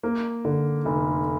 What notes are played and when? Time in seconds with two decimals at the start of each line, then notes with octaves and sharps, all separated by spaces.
0.03 A#3
0.45 D3
0.85 F1